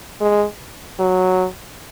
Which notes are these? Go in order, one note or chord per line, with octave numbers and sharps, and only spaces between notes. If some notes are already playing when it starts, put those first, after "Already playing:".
G#3
F#3